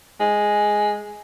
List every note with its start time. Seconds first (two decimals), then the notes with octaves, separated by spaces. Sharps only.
0.20 G#3